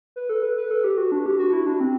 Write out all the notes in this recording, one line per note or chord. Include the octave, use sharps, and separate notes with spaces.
B4
A4
B4
B4
A4
G4
F#4
D4
G4
F#4
E4
D4
C4